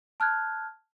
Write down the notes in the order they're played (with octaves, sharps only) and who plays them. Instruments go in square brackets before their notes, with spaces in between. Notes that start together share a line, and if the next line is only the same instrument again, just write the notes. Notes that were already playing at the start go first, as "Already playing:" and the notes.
[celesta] A5 F6 F#6 G#6